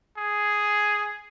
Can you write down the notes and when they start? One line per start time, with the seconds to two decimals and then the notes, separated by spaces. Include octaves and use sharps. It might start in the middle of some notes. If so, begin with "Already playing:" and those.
0.18 G#4